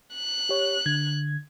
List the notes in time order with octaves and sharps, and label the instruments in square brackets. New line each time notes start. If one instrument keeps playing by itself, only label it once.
[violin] F#6
[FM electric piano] G4 C#5
D3 G#6